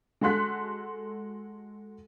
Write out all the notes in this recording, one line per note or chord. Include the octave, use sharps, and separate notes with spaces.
G#3 F#4 A4 C6 F#6 B6